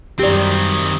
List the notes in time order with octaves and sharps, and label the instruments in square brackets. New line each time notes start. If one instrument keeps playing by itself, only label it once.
[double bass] F#2 G3 [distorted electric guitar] D#3 C4 [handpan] G4 D5